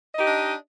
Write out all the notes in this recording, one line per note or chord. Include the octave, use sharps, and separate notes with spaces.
D4 D#4 G4 D#5